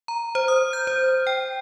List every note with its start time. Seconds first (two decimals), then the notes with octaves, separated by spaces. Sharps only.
0.08 A#5
0.35 C5
0.48 D#6
0.73 G6
0.87 C5
1.27 G5